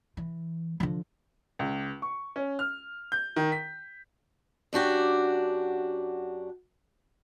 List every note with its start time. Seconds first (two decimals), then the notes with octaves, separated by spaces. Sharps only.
0.17 E3
0.80 D3 F3
1.59 C#2
2.02 C#6
2.36 C#4
2.59 F6
3.12 G6
3.36 D#3
3.52 B6
4.73 F#2 D4 F#4 G4